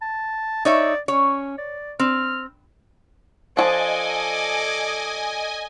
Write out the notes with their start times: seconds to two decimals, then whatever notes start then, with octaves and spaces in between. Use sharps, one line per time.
0.01 A5
0.65 D#4 C#5 D5 E5
1.08 C#4 C#5
1.58 D5
2.00 C4 F6
3.57 F3 F#3 D4 A4 D5 D#5 G#5